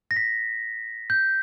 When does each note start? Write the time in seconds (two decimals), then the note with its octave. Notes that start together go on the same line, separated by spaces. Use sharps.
0.11 A#6
0.16 B6
1.10 G6